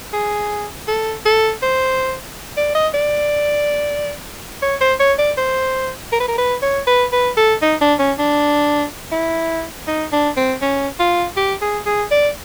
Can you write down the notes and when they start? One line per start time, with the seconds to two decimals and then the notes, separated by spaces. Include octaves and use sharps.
0.13 G#4
0.88 A4
1.26 A4
1.63 C5
2.57 D5
2.75 D#5
2.94 D5
4.62 C#5
4.81 C5
5.00 C#5
5.19 D5
5.37 C5
6.13 A#4
6.20 B4
6.28 A#4
6.38 B4
6.63 C#5
6.87 B4
7.12 B4
7.37 A4
7.62 D#4
7.81 D4
7.99 C#4
8.19 D4
9.12 E4
9.87 D#4
10.12 D4
10.37 C4
10.62 C#4
11.00 F4
11.37 G4
11.62 G#4
11.86 G#4
12.11 D5